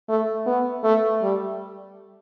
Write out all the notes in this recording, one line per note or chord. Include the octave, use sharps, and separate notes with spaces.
A3
B3
A3
G3